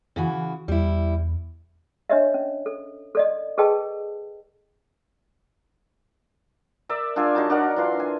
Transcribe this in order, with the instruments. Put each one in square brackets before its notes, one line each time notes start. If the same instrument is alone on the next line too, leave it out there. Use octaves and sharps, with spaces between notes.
[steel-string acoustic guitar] C#3 E3 F#4
[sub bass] E2 [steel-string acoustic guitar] G3 E4
[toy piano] D4 C#5 D#5 E5
C#4
A4
A4 D5 D#5
G#4 A4 B4 D#5 G5 A5
[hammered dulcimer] A#4 D5 E5
D4 F4 G#4 G#5
F#3 D#4 A5
D4 F#4 A#4 F#5
E3 F4 C6
G#5